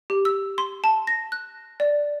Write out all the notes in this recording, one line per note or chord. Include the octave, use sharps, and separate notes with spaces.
G4
E6
C6
A5
A#6
F#6
D5